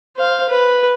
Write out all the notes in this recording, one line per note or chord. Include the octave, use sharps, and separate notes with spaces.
C5 F5
B4